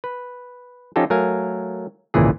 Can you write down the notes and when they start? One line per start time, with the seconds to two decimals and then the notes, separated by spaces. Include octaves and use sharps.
0.04 B4
0.96 F3 C#4 D#4 F4 G4 A4
1.10 F#3 A3 A#4 F5 G#5
2.14 G#1 C#2 A#2 E3 G#4